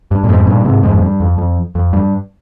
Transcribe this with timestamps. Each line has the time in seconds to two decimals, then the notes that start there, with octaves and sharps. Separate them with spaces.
0.11 G2
0.24 A#2
0.29 F2 G#2
0.47 G2 A#2
0.65 G#2 C3
0.83 F2 G#2
0.93 F2
1.02 G2
1.20 F2
1.38 F2
1.75 F2
1.93 G2